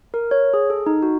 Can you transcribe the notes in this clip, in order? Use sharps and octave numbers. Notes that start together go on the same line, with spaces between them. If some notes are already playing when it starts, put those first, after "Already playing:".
A#4
C#5
G#4
A4
D#4
F#4